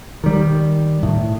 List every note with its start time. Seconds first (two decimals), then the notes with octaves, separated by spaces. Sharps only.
0.24 D#3 G3
1.03 A2